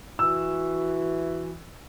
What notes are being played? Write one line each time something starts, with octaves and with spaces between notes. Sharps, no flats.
E3 F#4 E6